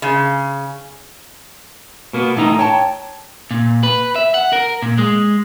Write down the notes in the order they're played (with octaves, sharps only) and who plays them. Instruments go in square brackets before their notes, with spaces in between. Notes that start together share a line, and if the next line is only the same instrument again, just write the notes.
[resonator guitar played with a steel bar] C#3
[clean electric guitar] B2 A#3 B3
[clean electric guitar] A2 D#4 A#5 [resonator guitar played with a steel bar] E3
[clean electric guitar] C#5 [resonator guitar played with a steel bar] G5 A5 A#5
[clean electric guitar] A#2
B4
E5
F#5
A#4
A#2
G#3